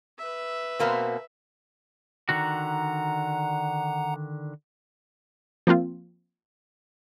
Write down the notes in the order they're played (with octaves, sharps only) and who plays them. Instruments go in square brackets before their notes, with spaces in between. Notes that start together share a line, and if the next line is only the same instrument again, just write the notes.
[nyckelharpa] B4 E5
[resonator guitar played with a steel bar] B2 A#3 C4
[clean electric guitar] D3 D#3 F#4 [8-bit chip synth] F#5 A#5
[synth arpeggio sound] F3 A#3 C4 F4